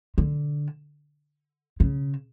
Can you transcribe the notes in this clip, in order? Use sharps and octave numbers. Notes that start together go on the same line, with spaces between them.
D3
C#3